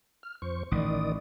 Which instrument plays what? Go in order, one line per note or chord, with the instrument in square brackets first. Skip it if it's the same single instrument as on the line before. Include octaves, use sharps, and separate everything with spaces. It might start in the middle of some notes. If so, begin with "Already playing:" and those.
[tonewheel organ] F6
F2 C5 C#6
[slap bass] A1 [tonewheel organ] D#3 D5 D#6